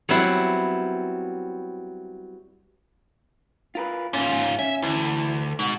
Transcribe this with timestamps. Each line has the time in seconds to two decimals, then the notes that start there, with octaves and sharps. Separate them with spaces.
0.09 F#3 G3 B3 C4 E4
3.75 F4 A#4 B4
4.13 D#2 G#2 C#4 F4
4.59 C#4 E5
4.82 D2 E3
5.59 G#2 B2